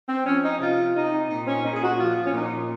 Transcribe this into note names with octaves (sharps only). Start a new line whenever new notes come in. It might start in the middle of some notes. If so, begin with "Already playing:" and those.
C4
F3 C#4
D#4
C3 F4
C3 D#4
A#2 D#4
C4
C#4
A#2 D#4
G#4
F#4
F3 F4
C#4
A#2 D#4